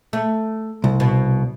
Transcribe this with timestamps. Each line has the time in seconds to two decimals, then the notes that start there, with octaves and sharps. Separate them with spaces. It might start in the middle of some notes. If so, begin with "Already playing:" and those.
0.13 A3
0.84 C2
1.00 B2